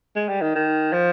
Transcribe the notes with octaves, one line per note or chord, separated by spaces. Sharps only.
G#3
G3
D#3
D#3
F3